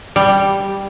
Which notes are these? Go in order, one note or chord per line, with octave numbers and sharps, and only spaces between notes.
G3